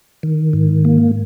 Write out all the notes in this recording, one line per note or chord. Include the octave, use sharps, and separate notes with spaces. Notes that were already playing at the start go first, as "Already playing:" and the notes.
D#3
G#2
A#3